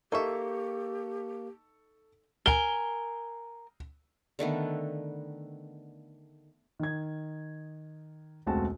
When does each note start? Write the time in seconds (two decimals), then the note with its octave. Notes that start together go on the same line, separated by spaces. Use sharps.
0.12 A#3 D#4 G4 A4 E5 C#6
2.46 A#4 G#5 G7
4.39 D3 D#3 A3 B3
6.80 D#3 G#6
8.47 E1 C#2 A3 C4 F#4 A5